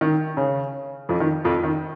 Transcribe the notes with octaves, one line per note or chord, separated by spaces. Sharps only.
D#3
C#3
F2 F3
D#3
F2 F3
D#3